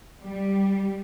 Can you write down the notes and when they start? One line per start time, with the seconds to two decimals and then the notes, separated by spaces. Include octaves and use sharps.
0.21 G3